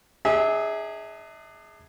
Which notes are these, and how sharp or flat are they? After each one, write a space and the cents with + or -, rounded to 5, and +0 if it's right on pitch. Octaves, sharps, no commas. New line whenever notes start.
D4 +35 G#4 +0 E5 -30